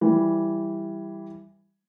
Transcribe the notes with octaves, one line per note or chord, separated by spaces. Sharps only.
E3 G3